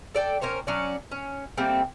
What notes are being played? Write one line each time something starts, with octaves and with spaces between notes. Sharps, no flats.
A4 D5 G5
C#4 A#4 C5 C#5
F#3 C#4 D4
C#4
G3 A3 A#3 C4